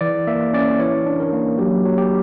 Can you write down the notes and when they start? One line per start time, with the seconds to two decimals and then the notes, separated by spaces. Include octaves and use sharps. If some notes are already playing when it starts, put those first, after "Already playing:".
0.01 E3 D5
0.27 A#3 E5
0.53 C#4 D5
0.80 E3 C#5
1.06 D4
1.20 A#4
1.33 A#3
1.59 F#3 G4
1.85 F#3
1.98 G4